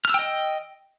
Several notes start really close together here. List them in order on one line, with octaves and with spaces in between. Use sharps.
F6 E6 G5 D#5